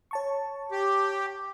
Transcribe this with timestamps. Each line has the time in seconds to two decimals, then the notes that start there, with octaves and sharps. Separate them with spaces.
0.11 C#5 A5 C#6
0.72 G4